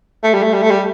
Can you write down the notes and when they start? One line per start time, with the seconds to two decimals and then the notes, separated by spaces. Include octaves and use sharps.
0.24 A3
0.34 G3
0.43 A3
0.54 G3
0.62 A3
0.70 G3